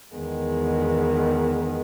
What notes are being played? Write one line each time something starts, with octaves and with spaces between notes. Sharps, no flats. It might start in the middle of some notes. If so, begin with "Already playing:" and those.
E2 D#3 G#3 B3